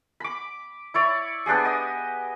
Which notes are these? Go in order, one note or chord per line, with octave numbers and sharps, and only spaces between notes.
B5 D6
E4 C#5 D5
B3 D4 G4 G#4
D#5